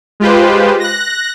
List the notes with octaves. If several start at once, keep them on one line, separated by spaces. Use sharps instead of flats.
G#3 F4 G4 B4 C5
F#6 A#6